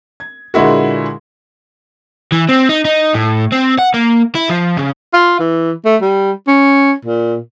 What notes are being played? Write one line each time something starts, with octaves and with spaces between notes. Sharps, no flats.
G#6
A#2 D3 G#3 E4 F#4
E3
C4
D#4
D#4
A2
C4
F#5
A#3
E4
F3
C#3
F4
E3
A3
G3
C#4
A#2